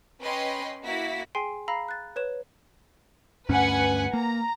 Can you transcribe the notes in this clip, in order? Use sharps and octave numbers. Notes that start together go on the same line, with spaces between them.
C#4 B4 D#5 G5 B5 C6
A#3 E4 F#4 A#5 B6
G#4 G5 G#5 C6 C7
F5 A#5 B5 E6 A#6 C7
F#6 A6
B4 C#5 E7
D2 G2 C#4 B4 F#5 G#5
A#3 A#5